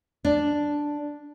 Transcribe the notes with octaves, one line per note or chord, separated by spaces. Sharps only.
D4